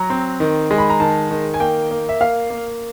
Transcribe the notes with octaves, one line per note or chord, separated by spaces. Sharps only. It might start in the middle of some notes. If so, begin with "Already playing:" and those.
Already playing: F#3 A#5
C4
D#3
G#3
B5
A#5
D#3 A5
D#3
G#5
A#3 G5
A#3
E5
A#3 F5
A#3